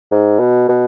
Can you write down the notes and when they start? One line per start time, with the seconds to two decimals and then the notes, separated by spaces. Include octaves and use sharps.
0.11 G#2
0.39 B2
0.69 B2